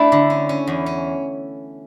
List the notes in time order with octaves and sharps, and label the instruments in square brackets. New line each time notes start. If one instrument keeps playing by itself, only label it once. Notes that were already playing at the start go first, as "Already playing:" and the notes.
Already playing: [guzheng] A3 D4 E4
D3
C#4
C#4
E2
C#4